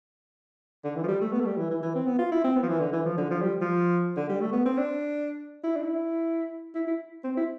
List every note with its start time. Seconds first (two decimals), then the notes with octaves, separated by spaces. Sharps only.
0.84 D3
0.96 E3
1.04 F3
1.08 G3
1.21 A3
1.33 B3
1.41 A3
1.45 G3
1.57 E3
1.70 E3
1.82 E3
1.95 C4
2.07 B3
2.19 F4
2.32 E4
2.44 C4
2.56 B3
2.63 F3
2.68 E3
2.80 D3
2.92 E3
3.05 F3
3.18 D3
3.30 F3
3.42 G3
3.61 F3
4.17 D3
4.29 G3
4.41 A3
4.52 B3
4.66 C4
4.78 D4
5.64 E4
5.76 D4
5.83 E4
6.75 E4
6.87 E4
7.24 C4
7.37 E4